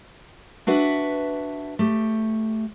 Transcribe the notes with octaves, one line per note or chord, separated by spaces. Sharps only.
D4 F#4 B4 E5
A3 G4